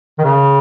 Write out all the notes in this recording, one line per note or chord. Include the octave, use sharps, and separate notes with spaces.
D#3
C#3